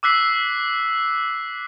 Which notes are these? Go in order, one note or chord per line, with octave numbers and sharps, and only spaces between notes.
D6 E6 F#6 B6 C7